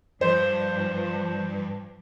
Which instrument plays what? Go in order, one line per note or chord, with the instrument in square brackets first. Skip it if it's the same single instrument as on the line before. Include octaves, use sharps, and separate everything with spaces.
[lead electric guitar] G2 [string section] F3 [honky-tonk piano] C5